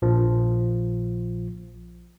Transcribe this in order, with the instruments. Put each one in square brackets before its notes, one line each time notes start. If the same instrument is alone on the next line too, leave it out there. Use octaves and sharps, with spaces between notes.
[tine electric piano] A#1 F3